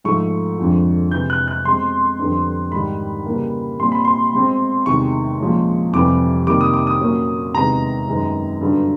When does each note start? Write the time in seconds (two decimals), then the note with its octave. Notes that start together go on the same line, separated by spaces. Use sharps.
0.04 G#2 F3 A3 C#6
0.58 F2 D3 F3 G#3
1.11 C3 E3 G#3 G6
1.30 F#6
1.48 F#6
1.65 B2 G#3 C4 C6
2.19 F2 D3 G3 B3 D4
2.72 G#2 D#3 G3 B5
3.26 C#3 E3 G3 A#3
3.79 A#2 G3 C4 C6
3.92 B5
4.05 C6
4.33 B2 G#3 C4
4.86 E2 C3 D#3 G#3 C#6
5.40 A#2 F3 G#3 C#4
5.93 F2 C3 E3 G3 D6
6.47 C3 D#3 G3 A#3 D6
6.61 D#6
6.74 D6
6.87 D#6
7.01 A#2 F#3 A#3 C#4
7.54 E2 C3 D#3 G#3 B3 A#5
8.08 F#2 D#3 G#3 B3
8.61 G2 D3 F#3 B3